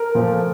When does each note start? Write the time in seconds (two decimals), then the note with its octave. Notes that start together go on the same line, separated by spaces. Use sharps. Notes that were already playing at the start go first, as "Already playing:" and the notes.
Already playing: A#4
0.15 A#2 F3 A3